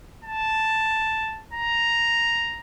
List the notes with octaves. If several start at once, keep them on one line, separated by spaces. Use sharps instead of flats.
A5
A#5